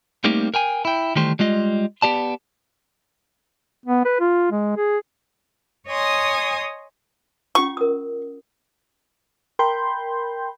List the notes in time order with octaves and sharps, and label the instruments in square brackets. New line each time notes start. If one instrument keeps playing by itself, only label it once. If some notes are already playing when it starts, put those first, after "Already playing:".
[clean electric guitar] G3 A3 A#3 C4 D#4 G4
A#4 G5 G#5
E4 G5
D#3 E3 G3 A3 G4 C5
G3 G#3 F4 D#5
B3 G4 D5 A5
[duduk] B3
B4
F4
G#3
G#4
[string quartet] C#5 D#5 G#5 C6 D#6
[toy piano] C#4 F4 F#5 [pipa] C#6
[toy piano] A#4 D#6
[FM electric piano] A#4 G5 B5 C6 G6